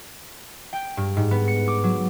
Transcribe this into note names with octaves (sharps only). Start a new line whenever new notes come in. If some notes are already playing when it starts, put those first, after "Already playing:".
G5
G2
G#2
B3
C#7
D6
F#3